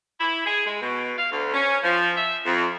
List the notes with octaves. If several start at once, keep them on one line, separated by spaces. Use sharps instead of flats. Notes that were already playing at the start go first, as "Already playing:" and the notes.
E4
G#4
G#3
B2
F5
D2
C#4
F3
E5
F2